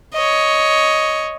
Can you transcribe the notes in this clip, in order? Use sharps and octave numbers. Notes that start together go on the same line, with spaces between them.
C#5 D#5